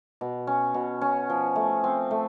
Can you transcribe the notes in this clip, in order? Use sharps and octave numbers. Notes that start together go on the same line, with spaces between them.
B2
C#4
B2
C#4
F3
A3
C4
A3